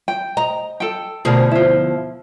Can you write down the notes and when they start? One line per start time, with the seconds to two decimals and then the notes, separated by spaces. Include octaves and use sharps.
0.08 G5
0.37 D#5 A#5
0.80 A4 G5
1.25 D2 B2 F3 G#4 A#4
1.51 E4 F4